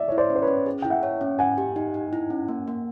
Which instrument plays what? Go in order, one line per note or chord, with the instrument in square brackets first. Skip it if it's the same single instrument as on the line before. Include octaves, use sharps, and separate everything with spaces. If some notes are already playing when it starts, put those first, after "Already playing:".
Already playing: [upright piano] D5 E5
[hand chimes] E4 [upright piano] C#5
[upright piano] C5 D5
[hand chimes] C#4
[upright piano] C5
B4 C#5
[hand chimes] C#4
G#4
[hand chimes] E4 [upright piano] G5
[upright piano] E5 F#5
[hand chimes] C#5
C#4
[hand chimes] B4 [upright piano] F#5 G#5
[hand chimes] G4
D#4
D#4
E4
C#4
A#3
A#3